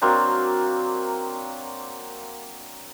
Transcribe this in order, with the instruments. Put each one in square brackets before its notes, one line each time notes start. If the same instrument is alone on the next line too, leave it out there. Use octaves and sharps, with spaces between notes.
[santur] F#3 A#3 C4 D4